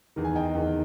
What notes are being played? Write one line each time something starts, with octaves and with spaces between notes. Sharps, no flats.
E2 D#3
G#5
D#5 G5
E2 D#3